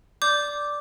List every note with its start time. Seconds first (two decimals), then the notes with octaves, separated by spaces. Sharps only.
0.22 D5 D6 G6